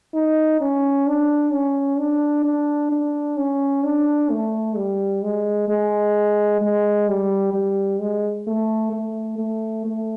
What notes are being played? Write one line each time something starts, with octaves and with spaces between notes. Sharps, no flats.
D#4
C#4
D4
C#4
D4
D4
D4
C#4
D4
A3
G3
G#3
G#3
G#3
G3
G3
G#3
A3
A3
A3
A3